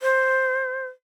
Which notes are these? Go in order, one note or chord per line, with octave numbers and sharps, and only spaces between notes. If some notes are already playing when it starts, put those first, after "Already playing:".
C5